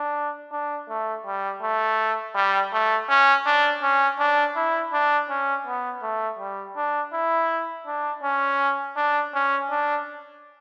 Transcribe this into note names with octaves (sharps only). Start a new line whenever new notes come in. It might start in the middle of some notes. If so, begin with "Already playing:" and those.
Already playing: D4
D4
A3
G3
A3
G3
A3
C#4
D4
C#4
D4
E4
D4
C#4
B3
A3
G3
D4
E4
D4
C#4
D4
C#4
D4